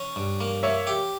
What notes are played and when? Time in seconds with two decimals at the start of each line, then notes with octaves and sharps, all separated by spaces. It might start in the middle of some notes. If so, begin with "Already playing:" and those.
Already playing: C#4
0.16 G2
0.40 A#3
0.63 A#3 C#5 E5
0.87 G4